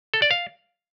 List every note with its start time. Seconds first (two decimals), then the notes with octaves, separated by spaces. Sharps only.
0.14 A4
0.22 D5
0.31 F5